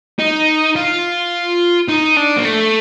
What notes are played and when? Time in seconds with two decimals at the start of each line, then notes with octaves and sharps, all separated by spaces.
0.19 D#4
0.76 F4
1.88 D#4
2.16 D4
2.37 A#3
2.45 A3